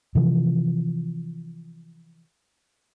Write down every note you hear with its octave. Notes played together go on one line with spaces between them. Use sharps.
C3 E3 F3